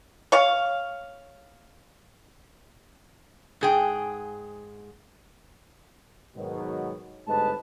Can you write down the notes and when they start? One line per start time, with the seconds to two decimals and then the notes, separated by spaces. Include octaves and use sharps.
0.32 C#5 F5
3.61 G#2 G#4 G5
6.36 G#2 B2 D#3 F#3
7.28 G1 G#2 A3 B4 D#5 A5